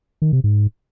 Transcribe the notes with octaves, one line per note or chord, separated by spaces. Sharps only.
D#3
C3
G#2